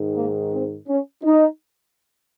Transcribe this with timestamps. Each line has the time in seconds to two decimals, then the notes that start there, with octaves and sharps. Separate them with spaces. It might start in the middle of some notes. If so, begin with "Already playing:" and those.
Already playing: G#2 D#3
0.16 A#3
0.52 C4
0.88 C#4
1.24 D#4